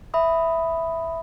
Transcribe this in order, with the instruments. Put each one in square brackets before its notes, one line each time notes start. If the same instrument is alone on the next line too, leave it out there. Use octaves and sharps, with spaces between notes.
[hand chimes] E5 B5 D#6